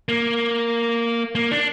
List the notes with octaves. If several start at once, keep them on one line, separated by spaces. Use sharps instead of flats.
A#3
A#3
D4